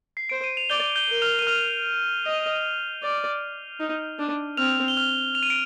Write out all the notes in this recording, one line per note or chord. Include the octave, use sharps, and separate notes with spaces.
C7
C5 D7
D#7
F7
D5 G6 G7
G6 G7
A#4
F6 F7
D#7
F6 F7
D#5
D5
D#4
D4
C4 F6 F7
G7
F6 F7
F7
D#7
D7